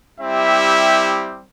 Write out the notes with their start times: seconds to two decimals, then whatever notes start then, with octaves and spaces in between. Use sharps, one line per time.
0.19 G3 C4 E4 G4 E5